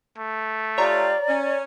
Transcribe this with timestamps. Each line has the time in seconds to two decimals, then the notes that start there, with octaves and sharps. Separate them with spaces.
0.18 A3
0.78 F4 G4 C#5 D5 A#5
1.28 C#4